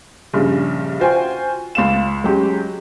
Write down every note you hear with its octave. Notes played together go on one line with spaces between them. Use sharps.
A#1 G2 C#3
F4 F#4 C5 G5 G#5
C#2 F5 E7
F#3 G#3 C#4 G4